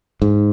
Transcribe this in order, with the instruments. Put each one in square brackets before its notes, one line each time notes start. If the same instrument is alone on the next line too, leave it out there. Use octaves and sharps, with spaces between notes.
[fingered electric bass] G#2